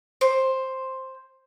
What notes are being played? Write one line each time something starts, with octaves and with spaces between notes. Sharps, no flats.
C5